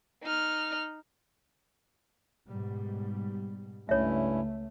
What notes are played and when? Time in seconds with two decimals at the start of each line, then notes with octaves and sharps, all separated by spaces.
0.23 D#4 F6
2.48 G#2 B2 G3
3.89 C#2 G2 A3 C#4 E4 C#5 E5